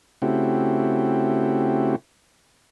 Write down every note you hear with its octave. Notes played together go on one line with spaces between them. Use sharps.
C#3 A3 C4 E4 F#4 G4